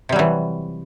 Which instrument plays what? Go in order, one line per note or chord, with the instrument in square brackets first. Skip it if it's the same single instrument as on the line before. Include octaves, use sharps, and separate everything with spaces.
[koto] C3
G3
F#3
E3